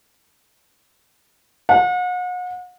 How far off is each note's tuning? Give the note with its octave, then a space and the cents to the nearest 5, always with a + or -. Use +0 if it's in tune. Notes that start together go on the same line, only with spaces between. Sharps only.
F#5 -40